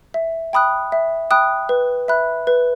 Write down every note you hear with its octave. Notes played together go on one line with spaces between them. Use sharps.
E5
G5 B5 D#6 F#6
E5
G5 B5 D#6 F#6
B4
E5 B5 F#6
B4